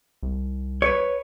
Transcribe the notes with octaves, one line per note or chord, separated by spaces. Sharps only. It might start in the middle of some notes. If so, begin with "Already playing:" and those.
C2
B4 C#5